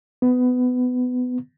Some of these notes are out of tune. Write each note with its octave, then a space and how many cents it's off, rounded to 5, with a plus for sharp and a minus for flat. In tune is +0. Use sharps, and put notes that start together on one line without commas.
B3 +20